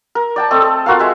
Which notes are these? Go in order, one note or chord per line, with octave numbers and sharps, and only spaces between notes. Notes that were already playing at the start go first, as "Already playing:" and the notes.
A#4
D5 G5 A5
A3 C4 A4 D#5
A4
F4 F#4 A#4 F5
G#3 E5 G#5